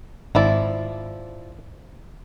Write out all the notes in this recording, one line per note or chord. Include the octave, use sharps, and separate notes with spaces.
G#1 F3 E4 D5